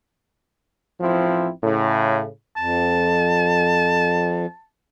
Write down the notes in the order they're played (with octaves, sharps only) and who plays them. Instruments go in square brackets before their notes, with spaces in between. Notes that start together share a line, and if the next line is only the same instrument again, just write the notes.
[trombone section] A1 F3 C4 E4
A2 C#3
[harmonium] F2 [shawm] A5